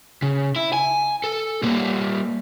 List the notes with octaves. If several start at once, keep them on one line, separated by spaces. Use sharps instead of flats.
C#3
E4
G#5
A4
G3 A#3